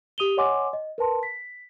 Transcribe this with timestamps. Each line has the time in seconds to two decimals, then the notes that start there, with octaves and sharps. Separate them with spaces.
0.18 G4 D#6 D#7 F7 G7
0.37 C#5 D#5 F#5 G#5 C6 D6
0.73 D#5
0.98 A#4 B4 A5 C6
1.23 B6